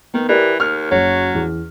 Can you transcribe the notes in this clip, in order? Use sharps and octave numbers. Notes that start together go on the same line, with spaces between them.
D#3 B3
E3 G4 A#4 D5
D#2 F6
F#1 F#3 C#5
E2